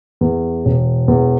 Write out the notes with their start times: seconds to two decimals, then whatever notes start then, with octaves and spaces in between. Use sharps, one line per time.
0.21 E2
0.65 E1
1.08 E2